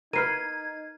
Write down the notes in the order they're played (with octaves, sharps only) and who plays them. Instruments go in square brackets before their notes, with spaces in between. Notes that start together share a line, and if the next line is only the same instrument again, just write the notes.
[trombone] D#4 [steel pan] A#4 B4 [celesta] F6 C7 D#7 [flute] G#6